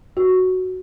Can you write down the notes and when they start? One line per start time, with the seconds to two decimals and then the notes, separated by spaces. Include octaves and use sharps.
0.17 F#4